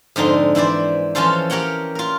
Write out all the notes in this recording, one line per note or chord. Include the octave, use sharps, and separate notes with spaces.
F2 G#2 D3 D#4 C6
E3 E4 C5 D5
E3 F3 C#4 F4 A4 C5
G4 A#4 C#5 F#5 G5
F4 A#4